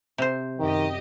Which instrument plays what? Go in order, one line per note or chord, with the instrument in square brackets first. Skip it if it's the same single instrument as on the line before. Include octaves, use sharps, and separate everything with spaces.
[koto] C3 C5
[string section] F#2 G4 D#5 [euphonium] D#3